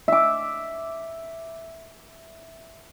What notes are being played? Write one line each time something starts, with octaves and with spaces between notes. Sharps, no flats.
E5 D6